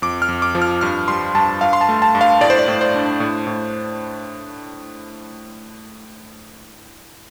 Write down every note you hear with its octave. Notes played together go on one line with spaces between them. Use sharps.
F2 D6
F6
F2
D6
F3
F6
G2 F6
G3 C6
G2 A5
G2 F5
C6
A5
A3
A5
G2
F5
A2 D5
C5
D5
A2
C5
D4
A2
A2